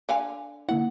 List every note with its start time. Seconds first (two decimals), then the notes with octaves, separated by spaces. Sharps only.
0.09 D3 F5 G#5
0.69 D3 A#3 E4 F#5